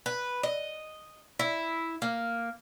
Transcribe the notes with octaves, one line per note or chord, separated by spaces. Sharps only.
B4
D#5
E4
A#3